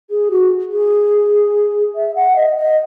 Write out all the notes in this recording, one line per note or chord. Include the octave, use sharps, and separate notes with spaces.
G#4
F#4
G#4
E5
F#5
D#5
D#5